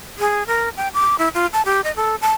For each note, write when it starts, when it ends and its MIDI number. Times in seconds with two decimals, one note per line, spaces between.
0.19 0.43 68
0.47 0.69 70
0.77 0.88 79
0.94 1.18 86
1.18 1.28 64
1.34 1.46 65
1.53 1.62 81
1.65 1.81 67
1.84 1.92 75
1.96 2.16 69
2.21 2.33 81